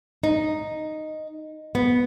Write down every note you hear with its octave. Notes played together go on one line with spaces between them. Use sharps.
D#4
B3